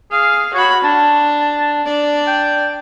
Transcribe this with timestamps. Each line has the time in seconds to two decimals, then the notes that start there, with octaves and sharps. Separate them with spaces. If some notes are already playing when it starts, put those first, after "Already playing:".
0.12 G#4 F5
0.54 F#4 C#5 B5
0.84 D4 A5
1.86 D4 D5
2.27 G5